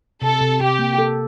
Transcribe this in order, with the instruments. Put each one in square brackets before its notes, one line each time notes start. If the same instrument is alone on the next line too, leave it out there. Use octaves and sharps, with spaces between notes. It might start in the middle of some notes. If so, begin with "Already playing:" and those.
[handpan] C3 [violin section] A4
[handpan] C3
[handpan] C3 [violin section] G4
[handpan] A#3
A4